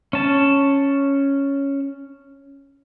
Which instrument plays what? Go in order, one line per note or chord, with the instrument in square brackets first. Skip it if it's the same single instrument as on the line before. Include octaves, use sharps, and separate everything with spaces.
[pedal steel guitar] C#4 A5